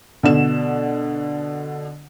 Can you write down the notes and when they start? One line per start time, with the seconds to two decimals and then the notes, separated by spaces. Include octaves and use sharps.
0.23 B2 D3 E7